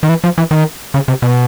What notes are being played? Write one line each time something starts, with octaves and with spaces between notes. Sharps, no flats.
D#3
E3
F3
E3
D#3
C#3
C3
B2